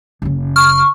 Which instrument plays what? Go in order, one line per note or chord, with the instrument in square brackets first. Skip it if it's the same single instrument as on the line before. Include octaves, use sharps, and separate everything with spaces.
[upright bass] F#1 C#3
[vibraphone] C#6 [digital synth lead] F6